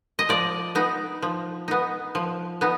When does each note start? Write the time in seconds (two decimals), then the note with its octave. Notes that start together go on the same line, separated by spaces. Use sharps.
0.19 D#5
0.29 F3 D5
0.75 B3 D#4
1.22 F3
1.68 B3 D#4
2.15 F3
2.61 B3 D#4